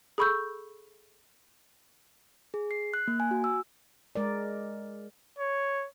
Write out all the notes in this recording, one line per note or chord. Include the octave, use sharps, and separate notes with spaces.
G#4 A4 B5 C#6 E6 G6
G#4
C7
F#6
A#3
G#5
F#4
E6
G#3 A#4 D5
C#5